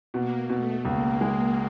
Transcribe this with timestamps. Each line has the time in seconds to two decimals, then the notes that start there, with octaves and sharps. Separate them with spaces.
0.14 B2 A#3
0.49 B2 A3
0.85 C#2 A#3
1.21 G#3